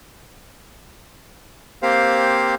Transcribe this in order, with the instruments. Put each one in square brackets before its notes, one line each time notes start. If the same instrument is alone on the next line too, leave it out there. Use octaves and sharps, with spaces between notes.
[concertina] A#3 C4 G4 C5 F5